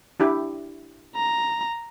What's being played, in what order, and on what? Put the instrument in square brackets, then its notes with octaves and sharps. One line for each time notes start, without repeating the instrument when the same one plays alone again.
[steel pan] D4 E4 G4
[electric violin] A#5